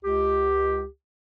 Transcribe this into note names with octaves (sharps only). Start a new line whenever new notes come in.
C#2 G4